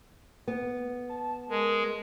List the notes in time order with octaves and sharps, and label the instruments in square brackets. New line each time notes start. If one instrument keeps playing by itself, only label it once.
[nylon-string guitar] B3
[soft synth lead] A5
[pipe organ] G#3 [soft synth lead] A#4